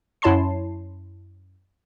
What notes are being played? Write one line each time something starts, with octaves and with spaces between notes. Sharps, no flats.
F#2 E4 C#5 A5 C6 C7